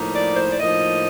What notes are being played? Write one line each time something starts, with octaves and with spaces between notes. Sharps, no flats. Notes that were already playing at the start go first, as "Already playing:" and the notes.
Already playing: A2 F3 A#3 D#4
D5
C5
D5
A2 F3 A#3 D#4 D#5